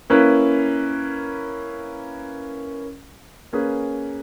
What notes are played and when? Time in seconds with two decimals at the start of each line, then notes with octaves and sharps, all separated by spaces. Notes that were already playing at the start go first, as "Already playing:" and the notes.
0.10 A#3 C#4 E4 B4
3.53 A#3 C#4 G#4 B4